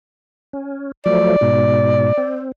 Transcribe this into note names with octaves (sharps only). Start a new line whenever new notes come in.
C#4
F3 F#3 A3 D5
G#2 B2
C4